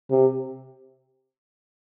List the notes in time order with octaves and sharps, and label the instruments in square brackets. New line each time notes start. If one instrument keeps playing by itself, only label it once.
[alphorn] C3